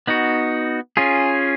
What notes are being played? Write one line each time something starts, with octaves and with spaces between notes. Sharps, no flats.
B3 D#4 F#4
C#4 F4 G#4